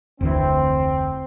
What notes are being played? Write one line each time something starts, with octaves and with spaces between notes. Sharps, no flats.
F1 D2 E3 C4